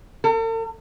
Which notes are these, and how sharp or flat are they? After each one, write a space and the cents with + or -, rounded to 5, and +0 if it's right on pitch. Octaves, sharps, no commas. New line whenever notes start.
A4 +45